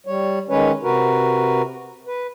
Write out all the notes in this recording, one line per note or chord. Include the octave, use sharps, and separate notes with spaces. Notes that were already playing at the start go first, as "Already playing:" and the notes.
G3 C#5
D#3 G#3 C#4 B4 C#5
C3 F#4 A#4 B4
B4